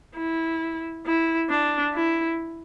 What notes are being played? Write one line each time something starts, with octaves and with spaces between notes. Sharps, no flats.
E4
E4
D4
E4